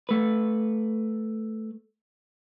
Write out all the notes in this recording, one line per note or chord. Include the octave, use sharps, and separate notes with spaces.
A3 B4